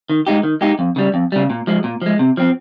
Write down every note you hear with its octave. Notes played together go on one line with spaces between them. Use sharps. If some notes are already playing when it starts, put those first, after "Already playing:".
D#3
G#3 D#4 G4
D#3
G#3 D#4 G4
F2
C#3 G3
F2
C#3 G3
A#2
F3 G#3
A#2
F3 G#3
C3
F3 C4